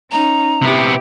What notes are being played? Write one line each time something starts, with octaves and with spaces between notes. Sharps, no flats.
C#4 D#4 A#5
C3 B3 E4 G4